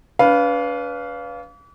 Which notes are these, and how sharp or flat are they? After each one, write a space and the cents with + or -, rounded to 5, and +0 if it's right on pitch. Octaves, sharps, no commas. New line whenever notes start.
D4 -45 B4 +0 F5 +0